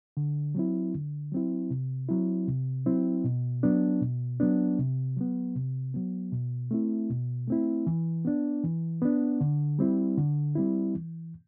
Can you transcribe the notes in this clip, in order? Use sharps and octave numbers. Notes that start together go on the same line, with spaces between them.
D3
F#3 C4 E4
D3
F#3 C4 E4
C3
F#3 C4 E4
C3
F#3 C4 E4
B2
F#3 B3 D4
B2
F#3 B3 D4
C3
F#3 B3
C3
F#3 B3
B2
A3 C4 E4
B2
A3 C4 E4
E3
B3 D4
E3
B3 D4
D3
G3 C4 E4
D3
G3 C4 E4
E3